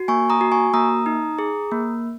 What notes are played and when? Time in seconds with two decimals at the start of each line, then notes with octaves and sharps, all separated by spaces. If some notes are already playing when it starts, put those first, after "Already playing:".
Already playing: F#4
0.08 A#3 G#5 C#6
0.30 A#5 D#6
0.41 F#4
0.52 G#5 C#6
0.73 A#3 A#5 D#6
1.06 D#4
1.39 G#4
1.71 A#3